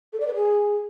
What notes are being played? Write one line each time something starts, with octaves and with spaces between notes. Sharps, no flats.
A4
D5
B4
G#4